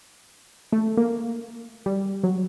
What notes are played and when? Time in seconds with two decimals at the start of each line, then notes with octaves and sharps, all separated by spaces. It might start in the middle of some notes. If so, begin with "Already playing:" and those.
0.72 A3
0.97 A#3
1.86 G3
2.23 F#3